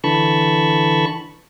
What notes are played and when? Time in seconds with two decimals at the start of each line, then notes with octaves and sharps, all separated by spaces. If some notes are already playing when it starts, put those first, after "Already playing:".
0.04 D3 E3 A5 B5 C#6